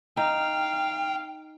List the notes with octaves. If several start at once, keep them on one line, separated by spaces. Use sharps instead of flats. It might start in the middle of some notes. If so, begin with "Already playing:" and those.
D#4 F5 G5